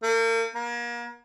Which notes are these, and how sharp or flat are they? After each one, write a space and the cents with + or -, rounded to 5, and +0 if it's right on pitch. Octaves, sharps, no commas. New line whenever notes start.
A#3 -40
A#3 +35